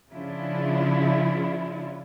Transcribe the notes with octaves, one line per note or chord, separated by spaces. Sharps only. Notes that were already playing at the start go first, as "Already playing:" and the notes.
C#3 F3 D4 E4 F4